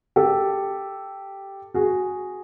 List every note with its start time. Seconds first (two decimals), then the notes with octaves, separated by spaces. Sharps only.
0.16 G4 A4
1.74 F#4 G#4